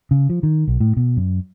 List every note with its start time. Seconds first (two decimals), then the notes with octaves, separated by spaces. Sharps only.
0.11 C#3
0.29 F3
0.43 D#3
0.68 B1
0.80 A2
0.97 B2
1.17 F#2